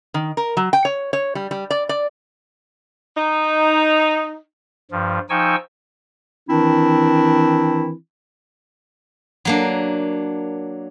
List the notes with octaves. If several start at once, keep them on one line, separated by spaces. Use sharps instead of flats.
D#3
A#4
F#3
G5
C#5
C#5
G3
G3
D5
D5
D#4
G2 F3
F3 D#4 G5 G#5 C#6 E6
D#3 E3 C4 D4 E4
F#3 A#3 D4